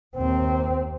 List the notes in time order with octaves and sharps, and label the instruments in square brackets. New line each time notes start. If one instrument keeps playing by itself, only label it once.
[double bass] D#2 C4